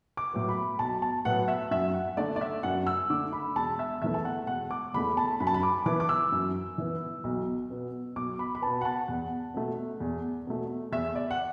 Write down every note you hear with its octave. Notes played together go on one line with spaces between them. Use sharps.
D6
A2 F#3 B3
B5
B1 A5
A5
A2 F#3 B3 F#5
E5
F#2 E5
F#5
D3 A3 D5
D5
E5
F#2 F#5
E6
D3 A3 D6
B5
E1 A5
E5
E2 E3 A3 E5
A5
F#5
E1 F#5
D6
E2 E3 A3 B5
A5
F#2 B5
A5
B5
D6
E3 B3 D6
D6
E6
F#2
E3 B3
B1
B2 B3
B1 D6
B5
B5
B2 B3 A5
F#5
A5
E2 F#5
B2 A3
E2
B2 A3
E2 E5
D5
F#5